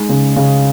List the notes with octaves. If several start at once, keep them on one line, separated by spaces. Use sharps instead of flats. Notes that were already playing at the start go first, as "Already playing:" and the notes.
Already playing: G#3 D#4
C#3
C#3